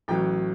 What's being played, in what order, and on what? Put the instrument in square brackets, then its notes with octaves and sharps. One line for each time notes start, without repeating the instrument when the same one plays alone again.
[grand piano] A1 A2 F#3 G5